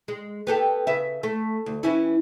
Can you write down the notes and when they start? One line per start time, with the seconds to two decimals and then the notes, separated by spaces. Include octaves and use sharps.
0.08 G#3
0.47 B3 G4 A4
0.87 C#3 B4 E5
1.23 A3
1.66 D2
1.83 E3 C#4 E4